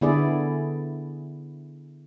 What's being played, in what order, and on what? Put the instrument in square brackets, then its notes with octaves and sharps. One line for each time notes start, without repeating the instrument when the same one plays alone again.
[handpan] D3 B3 E4 G#4 D5